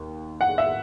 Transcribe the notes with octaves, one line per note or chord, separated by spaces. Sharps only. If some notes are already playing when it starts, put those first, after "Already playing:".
Already playing: D#2
F#5
E5